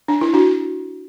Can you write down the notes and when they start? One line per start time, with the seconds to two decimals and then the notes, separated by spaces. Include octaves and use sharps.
0.08 D4
0.21 E4
0.33 D4 F#4